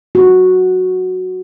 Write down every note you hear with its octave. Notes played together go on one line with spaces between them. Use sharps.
F#4